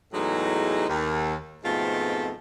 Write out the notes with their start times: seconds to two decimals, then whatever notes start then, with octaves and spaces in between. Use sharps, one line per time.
0.12 E2 A2 F#3 G#3 D#4
0.88 D#2
1.64 F2 G#2 B2 A3 C4 F4